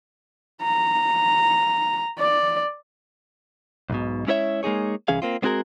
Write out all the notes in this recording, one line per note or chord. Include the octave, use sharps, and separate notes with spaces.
A#5
D5
B1 G#2 B2
G#3 C#4 E4 A#4 C#5 E5
G#3 A#3 D#4 G#4 C#5
C2 E3 C#4 G#4 F5
A#3 C4 F4
G#3 B3 C4 F#4 G#4 A#4